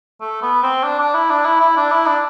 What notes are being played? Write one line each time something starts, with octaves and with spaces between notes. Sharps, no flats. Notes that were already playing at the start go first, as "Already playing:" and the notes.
A3
B3
C4
D4
D4
E4
D4
E4
E4
D4
E4
D4